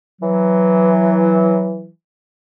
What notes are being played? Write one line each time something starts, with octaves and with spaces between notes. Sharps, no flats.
E3 F#3